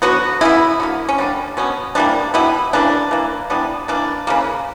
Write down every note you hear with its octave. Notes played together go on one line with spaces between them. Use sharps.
D3 F#3 B3 F#4
C#3 E3 B3 E4
D3 F#3 A#3
C#4
D3 G3 A#3 D4
B2 F#3 B3 C#4
E3 G3 A#3 D4
B2 G3 B3 E4
C#3 E3 A#3 D4
E3 A#3
E3 G3 B3 D4
E3 A#3 D4
C#3 E3 A#3